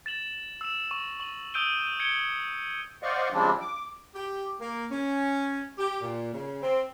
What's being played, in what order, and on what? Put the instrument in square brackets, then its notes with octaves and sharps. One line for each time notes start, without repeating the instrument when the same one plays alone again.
[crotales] A6 E7 F#7
E6 E7
C#6
C#6 F#7
D#6 E6 G6 D7 D#7 G7
G#6 C#7 D7 G7
[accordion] C5 D5 D#5 F5 F#5 C#6
C#3 F3 G3 G#3 C4 D4
D6
[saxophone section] G4
A#3
C#4
G4
A#2
C#3
C4